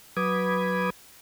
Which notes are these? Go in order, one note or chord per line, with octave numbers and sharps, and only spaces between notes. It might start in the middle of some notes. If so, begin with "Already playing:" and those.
F#3 B4 B5 D6 D#6 G#6